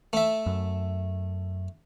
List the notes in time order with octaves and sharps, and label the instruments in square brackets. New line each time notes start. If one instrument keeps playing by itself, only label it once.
[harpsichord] A3 E5
[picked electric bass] F#2